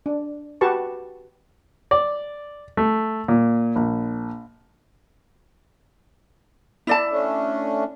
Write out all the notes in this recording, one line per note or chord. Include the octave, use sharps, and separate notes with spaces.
D4
F#4 G4 B4 A5 C#6
D5
A3
A#2
A#1
E4 D5 A5
A3 C#4 D4